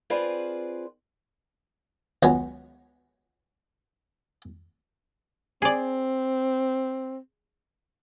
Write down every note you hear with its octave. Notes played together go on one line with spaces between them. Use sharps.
C4 F4 G#4 B4 C5 D5
C#2 F#3 B3 C#4 C#5
C4 G#4 D5